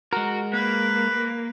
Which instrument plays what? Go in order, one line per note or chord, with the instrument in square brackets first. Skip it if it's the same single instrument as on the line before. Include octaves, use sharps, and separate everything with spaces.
[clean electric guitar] G#3 A#4 [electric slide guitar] F#4
[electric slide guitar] A#3 [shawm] B4